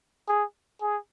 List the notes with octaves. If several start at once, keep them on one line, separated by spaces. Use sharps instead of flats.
G#4
G#4